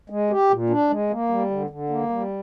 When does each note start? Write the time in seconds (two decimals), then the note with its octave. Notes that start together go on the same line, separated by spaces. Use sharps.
0.10 G#3
0.30 G4
0.51 A#2
0.70 D4
0.90 G#3
1.10 A#3
1.29 G3
1.50 D3
1.70 D3
1.90 A#3
2.10 G3